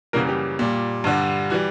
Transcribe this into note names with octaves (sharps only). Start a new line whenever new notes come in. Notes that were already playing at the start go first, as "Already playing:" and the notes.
F#2 C#3 E3 G3 A#3 A#4
G3 G4
A#2 G3
G2 D3 G3
E3 G3 F#4